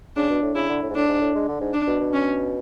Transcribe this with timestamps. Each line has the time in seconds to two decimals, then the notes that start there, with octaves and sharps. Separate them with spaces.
0.16 C#3 D4
0.30 B2
0.42 A2
0.55 C#3 E4
0.69 D3
0.83 A2
0.90 G#2
0.95 A2 D4
1.08 G#2
1.21 A2
1.35 G#3
1.48 D3
1.61 G#2
1.74 D4
1.87 B2
2.00 B2
2.13 C#4